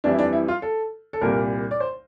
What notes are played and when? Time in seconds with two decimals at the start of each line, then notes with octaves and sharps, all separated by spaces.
0.04 F2 E3 G3 D4
0.12 E4
0.19 D4
0.33 E4
0.48 F4
0.62 A4
1.13 A4
1.21 C2 A#2 G3 A#4
1.71 D5
1.80 C5